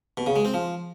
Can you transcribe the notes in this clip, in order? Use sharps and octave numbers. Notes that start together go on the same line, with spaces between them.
B2
C#3
G#3
C4
F3